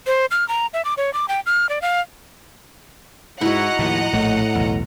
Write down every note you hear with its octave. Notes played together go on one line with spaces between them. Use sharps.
C5
F6
A#5
E5
D6
C#5
D6
G5
F6
D5
F5
G#2 E4 F#4 D#5 F#5 A#5
D#2 A2 F3
A#1 A2 A3
B1 E2